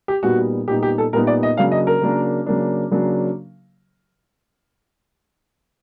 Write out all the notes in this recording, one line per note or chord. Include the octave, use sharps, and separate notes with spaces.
G4
A#2 G3 B3 D#4 F#4
A#2 G3 B3 D#4 G4
G4
A4
A#2 G3 B3 D#4 A#4
D5
D#5
C#3 F#3 A#3 D4 F5
D#5
A#4
C#3 F#3 A#3 D4
C#3 F#3 A#3 D4
C#3 F#3 A#3 D4